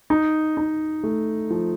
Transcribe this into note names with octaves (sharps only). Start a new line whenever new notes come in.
D#4
D#4
A3
F3